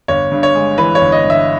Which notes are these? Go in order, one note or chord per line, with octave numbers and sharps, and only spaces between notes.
G1 C#5
G2
C#5
G#3
E3 B4
C#5
G1
D#5
G2
E5